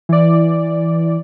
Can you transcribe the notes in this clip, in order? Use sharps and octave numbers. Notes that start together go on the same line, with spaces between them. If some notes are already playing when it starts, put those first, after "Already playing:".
E3 D5